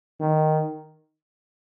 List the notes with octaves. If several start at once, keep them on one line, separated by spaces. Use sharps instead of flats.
D#3